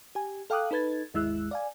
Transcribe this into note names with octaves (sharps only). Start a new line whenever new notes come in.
G4 G#5
A4 F5 G5 D6 D#6 F#6
D#4 A4 B4 G#6 A6
G#1 D#2 G#3 E4 E6 F#6
D5 F5 G#5